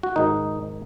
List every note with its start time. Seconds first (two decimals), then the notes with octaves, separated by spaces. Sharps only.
0.03 F#4
0.16 G#2 D#3 D#4